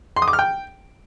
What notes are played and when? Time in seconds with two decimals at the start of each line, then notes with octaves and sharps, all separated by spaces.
0.16 C6
0.22 D#6
0.28 D6
0.33 F6
0.39 G5